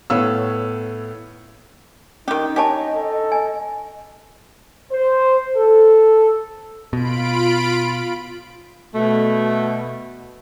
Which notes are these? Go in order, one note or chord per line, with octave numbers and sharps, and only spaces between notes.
A2 B3 C#5 F5 E6
D#3 C#4 D#4 G4
D4 G4 C#5 D#5 G#5 A5
A4
G#5
C5
A4
B2 F4 B5 D7
B2 A3